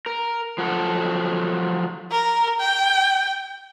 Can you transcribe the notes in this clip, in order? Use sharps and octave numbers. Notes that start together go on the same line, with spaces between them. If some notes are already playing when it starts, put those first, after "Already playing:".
A#4
F3 F#3 F#4 A4
A#4
G5